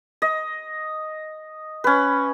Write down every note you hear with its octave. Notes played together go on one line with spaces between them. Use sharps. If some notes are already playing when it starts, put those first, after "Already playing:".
D#5
C#4 B4